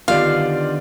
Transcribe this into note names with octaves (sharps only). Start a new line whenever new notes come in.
D3 D#3 B3 F4 G4 D5 F5